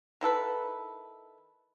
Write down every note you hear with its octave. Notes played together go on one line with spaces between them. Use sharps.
D#3 E4 A4 B4